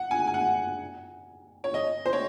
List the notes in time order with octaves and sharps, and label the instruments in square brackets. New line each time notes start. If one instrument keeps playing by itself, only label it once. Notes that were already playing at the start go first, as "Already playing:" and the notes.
Already playing: [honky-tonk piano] F#5
G#5
G#5
F#5
C#5
D#5
C5
C#5